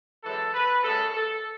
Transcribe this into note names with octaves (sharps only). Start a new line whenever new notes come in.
F#2 E3 G#3 A4
B4
F#2 C#3 G#3 A4
A4